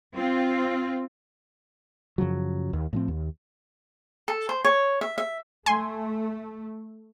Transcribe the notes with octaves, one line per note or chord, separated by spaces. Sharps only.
C4 F4
F#2 C#3 F3 F#3
D#2
A2 F3 C4
D#2
A4
C5
C#5
E5
E5
A3 G#5 C6